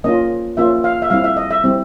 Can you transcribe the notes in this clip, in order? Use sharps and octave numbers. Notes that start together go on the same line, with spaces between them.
A#3 C#4 F4 D#5
A#3 C#4 F4 E5
F5
E5
G3 C4 E4 F5
E5
D#5
E5
G3 C4 E4